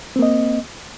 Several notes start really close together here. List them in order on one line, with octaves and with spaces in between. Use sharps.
C4 A#3 D#5